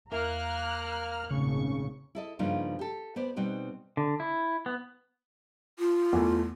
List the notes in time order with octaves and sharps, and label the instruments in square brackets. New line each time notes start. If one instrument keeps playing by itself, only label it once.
[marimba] E2 A#4 E5 [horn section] A#3 [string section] A#5 F6 F#6
[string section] G#1 C#6 [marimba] A#2 A3 [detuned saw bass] C#3
[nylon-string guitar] E4 A4 D#5
G2 C#3 F3 A#3 D#4 F4
G4 A4
B3 C5 D5
B2 G3 C4 D#4 B4
[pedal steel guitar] D3
E4
B3
[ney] F4
[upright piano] E2 E3 A3